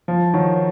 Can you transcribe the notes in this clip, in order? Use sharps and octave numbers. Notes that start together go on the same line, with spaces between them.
F3
D#3 F#3